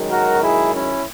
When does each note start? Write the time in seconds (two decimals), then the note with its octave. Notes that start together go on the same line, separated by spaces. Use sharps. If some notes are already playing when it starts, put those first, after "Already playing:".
Already playing: F#2 D#3 G#3
0.09 F#4 A#4
0.41 E4 G#4
0.73 C#4 E4